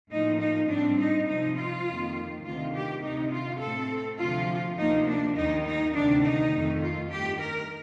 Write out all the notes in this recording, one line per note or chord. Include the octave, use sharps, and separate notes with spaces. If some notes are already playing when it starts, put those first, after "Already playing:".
A2 F3 A#3 D#4
D#4
A2 G3 C4 D4
D#4
C3 F3 C4 D#4
F4
F2 D#3 A#3
D2 C3 D#3 F4
G4
D2 C3 D#3 D#4
F4
A2 A3 C4 A4
D2 C3 F3 F4
D2 C3 F3 A#3 D#4
D4
D#2 D#3 A#3 D#4
D#4
D2 C3 D#3 D4
D#4
F2 D#3 A3
F4
G2 D#3 A3 G4
A#4